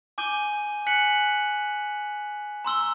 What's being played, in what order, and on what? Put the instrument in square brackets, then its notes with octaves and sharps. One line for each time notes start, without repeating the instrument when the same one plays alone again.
[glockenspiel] G#5 D6 G6 D#7 G7
G#5 F#6 B6 C#7 F#7
A#5 C6 E6 G7